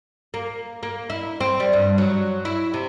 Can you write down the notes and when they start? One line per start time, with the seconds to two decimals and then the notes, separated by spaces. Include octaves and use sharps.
0.34 A#3
0.83 A#3
1.10 E4
1.40 C4
1.60 G3
1.73 G2
1.98 F#3
2.45 E4
2.74 C3